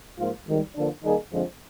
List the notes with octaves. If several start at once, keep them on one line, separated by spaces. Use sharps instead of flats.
G#2 F3 A#3 F4
G#1 G#2 D#3 G3
D3 F3 A#3 D4
D#3 G3 A#3 D#4 G#4
F2 D3 F3 G#3 C4